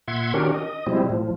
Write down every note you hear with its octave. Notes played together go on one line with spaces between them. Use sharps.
A#2 E5 F#5 C6 G#6
D#3 C#4 D4 F#4 G4 A#4
D#5
B2 F3 G3 G#3 C4 E4
A2 F3